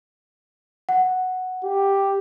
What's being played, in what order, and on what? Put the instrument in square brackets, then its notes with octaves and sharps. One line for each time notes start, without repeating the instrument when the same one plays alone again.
[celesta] F#5
[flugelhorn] G4